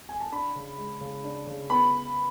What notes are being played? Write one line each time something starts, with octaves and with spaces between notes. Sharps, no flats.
G#5
A5
D4 B5
C#3
G#3
C#3
D4
C#3
B3 B5